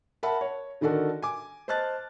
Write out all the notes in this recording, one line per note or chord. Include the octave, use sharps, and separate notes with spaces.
A#4 E5 F#5 A5 B5
C#5
D3 D#3 D4 F#4 A4 A#4
G#5 D6
C5 D#5 A5 F6 F#6 A6